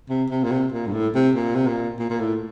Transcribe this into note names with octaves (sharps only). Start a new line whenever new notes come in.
C3
C3
A#2
C3
A#2
G2
A2
C3
A#2
C3
A#2
A#2
A#2
A2